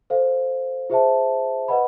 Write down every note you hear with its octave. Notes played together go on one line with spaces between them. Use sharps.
A4 C5 F5
F4 G#4 C5 E5 A5
B4 D#5 F#5 B5